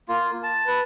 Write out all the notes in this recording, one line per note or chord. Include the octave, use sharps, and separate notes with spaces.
A#3 F4
A5
B4